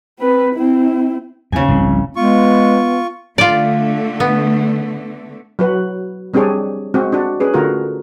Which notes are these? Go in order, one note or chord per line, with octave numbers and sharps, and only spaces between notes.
C4 B4
C4 E4
D#2 C#3 G#5
F1 C2 G#2
G#3 B3 F4 C#6
D3 A3 F4 D5
B3
F#3 F#4 B4
G3 C4 D4 G4 G#4 C#5
G#3 C4 F#4
D4 F#4
C#4 G#4 B4
D3 A3 F4 F#4 A#4